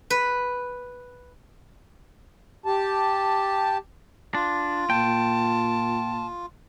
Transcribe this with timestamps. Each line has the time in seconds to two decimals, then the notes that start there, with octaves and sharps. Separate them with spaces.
0.10 B4
2.66 G4 A5
4.35 D4 F4
4.90 A#2 G5 A5